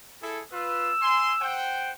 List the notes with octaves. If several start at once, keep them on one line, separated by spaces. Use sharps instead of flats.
E4 G#4 A4
F4 B4 E6
G#5 C6
C5 F#5 G5